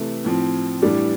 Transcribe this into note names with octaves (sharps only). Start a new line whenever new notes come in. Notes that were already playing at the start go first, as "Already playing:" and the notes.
Already playing: C3 E3 A3 E4 A4
A2 F3 C4
A2 E3 G3 D4